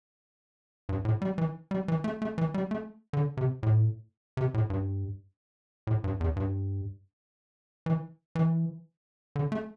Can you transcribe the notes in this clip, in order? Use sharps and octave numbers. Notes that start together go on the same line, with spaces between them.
G2
A2
G3
E3
G3
E3
A3
A3
E3
G3
A3
D3
C3
A2
C3
A2
G2
A2
G2
E2
G2
E3
E3
D3
A3